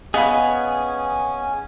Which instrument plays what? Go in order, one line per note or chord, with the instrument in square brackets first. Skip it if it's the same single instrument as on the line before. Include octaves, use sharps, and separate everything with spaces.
[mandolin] B3 [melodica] C#4 G#5 [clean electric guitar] G#4 [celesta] D#5 F5 B5